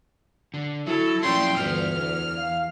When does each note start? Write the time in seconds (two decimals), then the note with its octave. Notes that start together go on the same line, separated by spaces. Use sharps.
0.54 D3
0.87 F#3 E4 A4
1.23 A#2 F3 F#3 C#4 E4 G5 C6
1.57 D2 G2 D3 E3 B3 F6
1.95 E2
2.37 F5